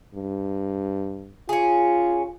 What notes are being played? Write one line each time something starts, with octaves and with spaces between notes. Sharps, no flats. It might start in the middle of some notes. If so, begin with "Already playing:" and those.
G2
C#4 F4 G#4